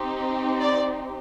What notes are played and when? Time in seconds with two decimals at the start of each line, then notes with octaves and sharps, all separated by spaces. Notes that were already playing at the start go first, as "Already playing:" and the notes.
Already playing: C4 D#4 G4
0.60 D5